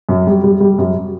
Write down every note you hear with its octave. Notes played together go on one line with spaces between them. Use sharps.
F#2
G3
G3
G3
F#2